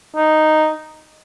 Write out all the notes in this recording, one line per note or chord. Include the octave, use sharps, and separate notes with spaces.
D#4